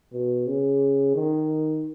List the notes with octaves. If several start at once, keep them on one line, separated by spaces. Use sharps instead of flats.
B2
C#3
D#3